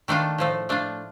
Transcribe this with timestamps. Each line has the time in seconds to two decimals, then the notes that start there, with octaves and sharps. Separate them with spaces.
0.08 D#3 A3 D4 F4
0.38 A2 F3 A3
0.69 A3 D4 F4